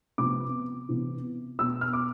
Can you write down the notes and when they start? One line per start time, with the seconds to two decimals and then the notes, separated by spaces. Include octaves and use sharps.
0.18 C3 F3 B3 D6
0.89 C3 E3 B3
1.58 B2 B3 E6
1.81 F6
1.93 D6